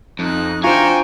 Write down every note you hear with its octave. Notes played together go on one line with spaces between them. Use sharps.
F2 D#4 F#6
D4 F4 C5 G5 G#5 A#5 C#6